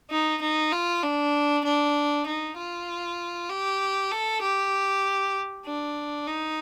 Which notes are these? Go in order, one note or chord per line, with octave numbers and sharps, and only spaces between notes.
D#4
D#4
F4
D4
D4
D#4
F4
G4
A4
G4
D4
D#4